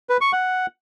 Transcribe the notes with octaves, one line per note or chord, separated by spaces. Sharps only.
B4
C#6
F#5